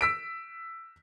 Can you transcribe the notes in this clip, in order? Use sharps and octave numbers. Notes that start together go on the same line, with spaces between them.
E6 B6 D7